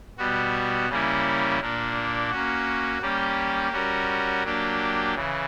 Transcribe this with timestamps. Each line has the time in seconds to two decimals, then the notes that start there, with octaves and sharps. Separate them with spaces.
0.18 B2 G3 B3 F#4
0.89 C#3 G3 A#3 C#4 E4
1.61 A#2 A#3 D4
2.31 A#3 C#4 F#4
3.02 G3 A#3 C#4 G4
3.72 G3 C#4 F#4 A#4
4.44 F#3 A#3 D4 G4
5.15 C#3 E3